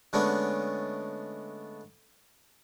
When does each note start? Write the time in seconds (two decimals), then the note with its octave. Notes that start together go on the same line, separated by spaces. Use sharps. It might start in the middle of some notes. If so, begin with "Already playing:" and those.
0.13 D3 G#3 A3 B3 C#4 D4